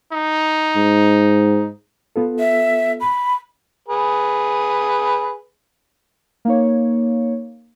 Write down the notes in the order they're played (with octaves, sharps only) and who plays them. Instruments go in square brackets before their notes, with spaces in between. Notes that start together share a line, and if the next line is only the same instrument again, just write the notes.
[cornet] D#4
[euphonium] G#2
[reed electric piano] B3 F4 A4
[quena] E5
B5
[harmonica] G#4 B4
[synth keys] A#3 D#4 C#5